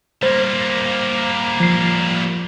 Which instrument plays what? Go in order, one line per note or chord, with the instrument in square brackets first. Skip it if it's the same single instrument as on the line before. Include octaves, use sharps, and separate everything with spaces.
[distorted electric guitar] G3 A#3 [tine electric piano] C5
[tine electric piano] F3 C7